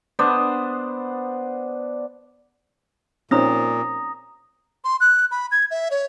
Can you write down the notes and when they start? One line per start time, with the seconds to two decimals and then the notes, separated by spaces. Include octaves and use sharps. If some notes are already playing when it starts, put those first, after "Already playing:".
0.19 B3 D4 C5
3.31 A#2 C4 C#4 D#4 A#5 D#6 A#6
4.84 C6
5.00 F#6
5.31 B5
5.51 G#6
5.71 E5
5.91 C#5